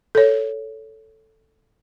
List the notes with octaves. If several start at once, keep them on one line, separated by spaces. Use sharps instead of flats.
A4 C#5